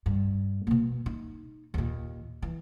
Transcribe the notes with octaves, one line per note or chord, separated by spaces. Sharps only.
G2
B2 A#3
D#4
D#2 A#2
E3